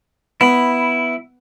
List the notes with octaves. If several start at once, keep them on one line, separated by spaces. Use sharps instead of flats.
B3 E4 B5